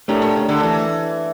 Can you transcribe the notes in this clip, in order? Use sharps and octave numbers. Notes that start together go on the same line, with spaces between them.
A2 A3 D4 G4 A#4
A#2
C#3
D3
E3